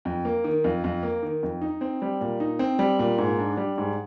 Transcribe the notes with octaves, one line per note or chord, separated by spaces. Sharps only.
F2
A#3
D#3
F2
F2
A#3
D#3
F2
D#4
C4
G3
A#2
D#4
C4
G3
A#2
G#2
D4
G3
G#2